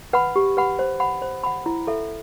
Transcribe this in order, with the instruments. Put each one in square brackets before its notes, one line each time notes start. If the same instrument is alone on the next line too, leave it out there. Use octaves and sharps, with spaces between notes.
[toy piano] B4 F#5 B5
G4
B4 F#5 B5
C5
F#5 B5
C5
F#5 B5
E4
A4 E5